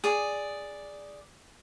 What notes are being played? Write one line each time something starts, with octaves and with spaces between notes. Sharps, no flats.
G#4 D5